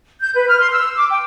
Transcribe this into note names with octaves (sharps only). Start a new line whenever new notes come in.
G6
B4
F6
C6
E6
D6
G5